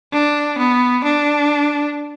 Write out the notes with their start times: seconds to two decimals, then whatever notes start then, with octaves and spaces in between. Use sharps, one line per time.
0.13 D4
0.58 B3
1.04 D4